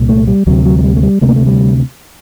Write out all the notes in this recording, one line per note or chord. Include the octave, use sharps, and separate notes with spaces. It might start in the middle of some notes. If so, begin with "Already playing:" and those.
Already playing: C2 A#2
A3
G3
D2 C3 F#3
F#3
F#3
G3
A3
G3
D2 C3 A3
A#3
A3
G3